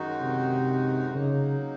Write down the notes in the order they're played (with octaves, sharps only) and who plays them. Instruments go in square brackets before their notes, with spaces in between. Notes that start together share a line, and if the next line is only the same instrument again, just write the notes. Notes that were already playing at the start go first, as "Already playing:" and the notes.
Already playing: [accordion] F#2 D#3 G#3 D#4 F#4
[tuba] C3
[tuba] C#3 [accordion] F#3 A#3 D#4